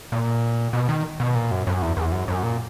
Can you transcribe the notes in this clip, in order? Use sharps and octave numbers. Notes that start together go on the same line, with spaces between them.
A#2
B2
D#3
B2
A#2
F#2
F#2
E2
E2
F#2
F#2
A#2